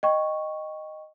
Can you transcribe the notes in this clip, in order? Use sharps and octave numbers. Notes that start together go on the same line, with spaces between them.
D#5 G5 C#6